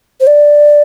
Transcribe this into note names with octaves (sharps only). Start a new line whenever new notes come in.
C5
D5